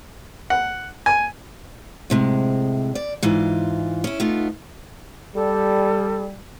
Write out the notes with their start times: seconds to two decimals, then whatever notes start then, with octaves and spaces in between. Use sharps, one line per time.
0.50 F#5
1.06 G#5
2.10 A2 C3 G#3
2.95 D5
3.22 G#2 E3 F4
4.04 C#4 E4
4.20 A3 B3 D#4 F4
5.35 G3 A4